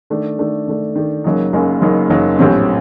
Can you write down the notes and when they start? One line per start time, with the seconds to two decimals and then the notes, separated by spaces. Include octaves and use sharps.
0.10 D#3 A3 D4
0.39 D#3 A3 D4
0.68 D#3 A3 D4
0.95 D#3 A3 D4
1.24 F#1 F#2 F#3 A#3 D#4
1.53 F#1 F#2 F#3 A#3 D#4
1.82 F#1 F#2 F#3 A#3 D#4
2.10 F#1 F#2 F#3 A#3 D#4
2.39 A#1 A2 F#3 C4 G4